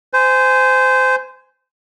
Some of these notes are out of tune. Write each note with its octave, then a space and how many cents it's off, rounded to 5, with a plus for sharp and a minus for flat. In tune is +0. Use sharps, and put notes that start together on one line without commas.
C5 -20 G#5 +0